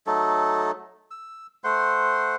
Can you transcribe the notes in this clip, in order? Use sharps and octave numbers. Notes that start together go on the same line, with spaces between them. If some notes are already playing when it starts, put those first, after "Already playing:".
F#3 A3 D#4 A4
E6
A3 C5 F#5 C6